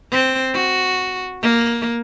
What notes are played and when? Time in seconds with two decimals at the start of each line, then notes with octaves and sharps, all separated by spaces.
0.12 C4
0.54 F#4
1.42 A#3